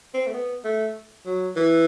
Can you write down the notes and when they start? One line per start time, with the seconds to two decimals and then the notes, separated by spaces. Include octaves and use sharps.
0.14 C4
0.27 A3
0.34 B3
0.65 A3
1.26 F#3
1.56 E3